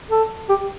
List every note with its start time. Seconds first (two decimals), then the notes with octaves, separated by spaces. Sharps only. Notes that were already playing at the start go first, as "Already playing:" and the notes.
0.11 A4
0.49 G4